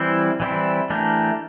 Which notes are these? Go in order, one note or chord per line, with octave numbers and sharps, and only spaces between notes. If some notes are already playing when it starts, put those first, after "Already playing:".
Already playing: E3 G3 C4 E4
E3 G3 C4 E4
E3 A3 D4 G4 A#4